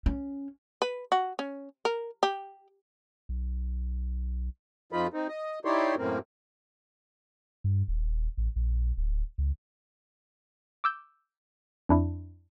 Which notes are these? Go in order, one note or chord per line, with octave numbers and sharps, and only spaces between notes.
C#4
B4
F#4
C#4
A#4
G4
B1
F2 F3 D#4 F4 B5
C4 D#4
D#5
D#4 E4 G4 C#5 D5 C6
F#2 A2 A#3 C4
G2
D#1
A1
A#1
D1
C#2
D6 E6 G6
F2 D4 E4